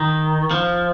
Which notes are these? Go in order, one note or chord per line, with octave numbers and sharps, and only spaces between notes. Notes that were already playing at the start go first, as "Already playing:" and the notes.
Already playing: D#3
F3